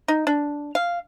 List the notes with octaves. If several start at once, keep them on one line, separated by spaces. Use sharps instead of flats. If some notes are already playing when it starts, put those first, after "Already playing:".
D#4
D4
F5